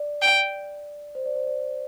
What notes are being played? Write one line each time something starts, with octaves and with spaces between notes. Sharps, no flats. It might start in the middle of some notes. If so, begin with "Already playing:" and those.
Already playing: D5
G5
C5
D5
C5
D5